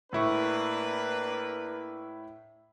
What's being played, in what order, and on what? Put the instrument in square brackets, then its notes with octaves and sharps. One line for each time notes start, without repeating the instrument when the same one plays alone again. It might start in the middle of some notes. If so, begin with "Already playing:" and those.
[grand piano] A2 E4 C#6 [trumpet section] A#3 D4 B4